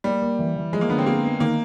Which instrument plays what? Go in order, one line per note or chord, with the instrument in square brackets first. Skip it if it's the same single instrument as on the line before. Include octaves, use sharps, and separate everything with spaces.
[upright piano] G3 [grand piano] A#3
[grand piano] A#3
E3
E3
[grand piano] F3 [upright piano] G#3
[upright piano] A#3
[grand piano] D3 [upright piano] B3
[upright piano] C4
[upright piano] A#3 [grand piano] G#4
[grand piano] B3
[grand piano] D#3 [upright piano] A#3